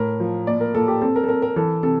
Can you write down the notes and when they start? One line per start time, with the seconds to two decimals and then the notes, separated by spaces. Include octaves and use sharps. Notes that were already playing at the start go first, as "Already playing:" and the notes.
Already playing: A2 A#4
0.20 F3
0.47 A#2 D5
0.61 A#4
0.75 A#2 A4
0.88 G4
1.02 C4 A4
1.16 A#4
1.24 A4
1.28 C4 A#4
1.42 A#4
1.56 E3 A4
1.83 C3 A4